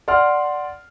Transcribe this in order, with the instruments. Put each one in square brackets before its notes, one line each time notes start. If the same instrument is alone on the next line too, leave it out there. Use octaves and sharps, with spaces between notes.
[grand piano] D5 F#5 C6 F6